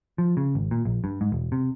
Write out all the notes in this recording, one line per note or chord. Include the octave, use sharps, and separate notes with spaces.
F3
C#3
G#1
A#2
A#1
G2
G#2
E1
C3